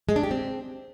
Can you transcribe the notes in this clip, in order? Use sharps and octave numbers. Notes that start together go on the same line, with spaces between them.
G#3
D4
G4
C4